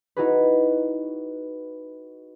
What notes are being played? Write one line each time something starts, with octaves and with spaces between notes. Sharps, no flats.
D#4 E4 F#4 G#4 B4